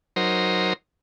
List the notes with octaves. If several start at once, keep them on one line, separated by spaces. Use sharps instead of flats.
F#3 D#4 A#4 C5